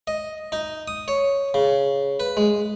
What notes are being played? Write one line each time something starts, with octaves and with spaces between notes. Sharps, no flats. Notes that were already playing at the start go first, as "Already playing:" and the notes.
D#5
D#4
D#6
C#5
C#3
B4
G#3